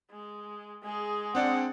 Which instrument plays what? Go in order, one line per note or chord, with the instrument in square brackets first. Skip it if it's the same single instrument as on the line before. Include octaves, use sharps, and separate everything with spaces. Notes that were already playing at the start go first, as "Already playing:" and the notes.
[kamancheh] G#3
G#3 G#4
[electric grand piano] C4 D4 D5 [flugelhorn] F#5